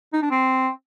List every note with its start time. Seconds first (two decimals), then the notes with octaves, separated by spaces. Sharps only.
0.13 D#4
0.22 D4
0.31 C4